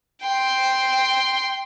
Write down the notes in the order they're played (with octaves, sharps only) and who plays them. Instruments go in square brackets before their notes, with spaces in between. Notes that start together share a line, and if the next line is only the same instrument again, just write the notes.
[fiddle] G5 C6